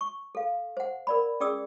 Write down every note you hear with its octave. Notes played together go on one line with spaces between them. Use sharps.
C#6
A4 F5
C5 F#5
A#4 D5 B5
C#4 G#4 D5 D#6 E6